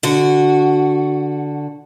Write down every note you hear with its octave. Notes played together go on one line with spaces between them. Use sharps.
D3 F#4